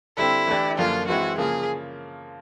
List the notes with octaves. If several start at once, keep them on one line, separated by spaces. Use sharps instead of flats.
D3 G3 C4 E4
E3 A3 D4 G4
F#2 D3 F3 A#3 F4
E3 G#3 C4 E4 F#4
C#3 F3 A#3 G#4